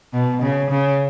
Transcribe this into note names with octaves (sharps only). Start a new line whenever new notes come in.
B2
C#3
C#3